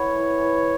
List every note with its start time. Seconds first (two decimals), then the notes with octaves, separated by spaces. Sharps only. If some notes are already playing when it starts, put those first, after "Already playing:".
Already playing: B3 E4 C#5
0.11 E3
0.38 E3